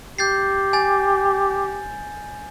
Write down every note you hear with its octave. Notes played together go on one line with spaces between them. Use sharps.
G4 G6 A6 C7
G#5 A6